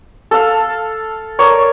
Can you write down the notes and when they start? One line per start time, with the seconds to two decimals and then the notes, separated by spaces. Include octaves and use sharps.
0.31 A4 F5
1.39 A#4 C#5 D5